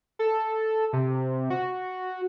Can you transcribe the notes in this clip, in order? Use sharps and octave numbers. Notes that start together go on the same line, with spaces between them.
A4
C3
F#4